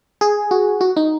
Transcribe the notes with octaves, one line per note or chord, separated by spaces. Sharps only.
G#4
F#4
F#4
D#4